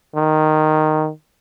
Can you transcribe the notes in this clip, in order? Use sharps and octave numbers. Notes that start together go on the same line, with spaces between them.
D#3